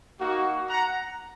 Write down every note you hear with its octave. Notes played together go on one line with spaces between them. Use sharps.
A#3 D#4 F#4
F#5 A#5